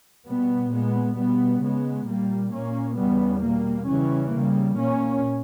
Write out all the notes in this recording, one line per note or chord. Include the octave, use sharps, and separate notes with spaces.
B2 G3 B3
A#2 G#3 B3
B2 G3 B3
C#3 G#3 B3
A#2 G3 A#3
A#2 A#3 C#4
E2 C#3 G3 B3
B2 G3 A#3
C#3 E3 G3 C#4
C#3 G3 A#3
A#2 A#3 C#4